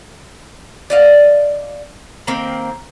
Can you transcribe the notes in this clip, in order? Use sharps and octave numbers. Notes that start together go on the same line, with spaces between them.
D5 D#5 F5
D#3 A#3 C4